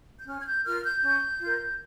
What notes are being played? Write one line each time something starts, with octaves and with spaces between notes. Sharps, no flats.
G6
C#4 F6
G#6
G6
F4 A#4 F6
G6
C#4
F4 A#4